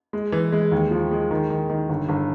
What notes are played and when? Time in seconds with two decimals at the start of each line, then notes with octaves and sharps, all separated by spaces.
0.13 G#3
0.32 E3
0.52 G#3
0.72 D#2
0.91 F3
1.11 G#3
1.31 D#3
1.50 D#3
1.70 D#3
1.89 G1
2.09 G1